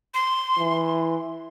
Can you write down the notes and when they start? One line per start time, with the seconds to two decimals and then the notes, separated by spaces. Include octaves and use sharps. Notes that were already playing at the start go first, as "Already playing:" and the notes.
0.14 C6
0.59 E3